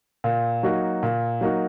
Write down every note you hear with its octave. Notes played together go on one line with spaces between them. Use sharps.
A#2
F#3 A#3 D#4 F#4
A#2
F#3 A#3 D#4 F#4